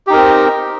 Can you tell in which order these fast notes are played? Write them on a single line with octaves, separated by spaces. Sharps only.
G4 D#4 A#4 C4